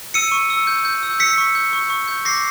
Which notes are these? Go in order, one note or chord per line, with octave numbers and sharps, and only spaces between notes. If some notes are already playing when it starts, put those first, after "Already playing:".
E6 C#7 D#7
C#6
E6
G6
G6
E6
E6 B6 C#7
C#6
G6
C#6
C#6
G6
D6 A#6 C7